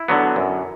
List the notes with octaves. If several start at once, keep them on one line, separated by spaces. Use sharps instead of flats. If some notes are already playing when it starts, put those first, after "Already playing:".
Already playing: E4
D3 F#3 B3
F#2